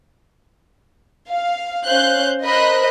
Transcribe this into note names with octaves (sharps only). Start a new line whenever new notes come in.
F5
C#4 C5 F5 F#6 G6
A#4 C5 D#5 B5 F#6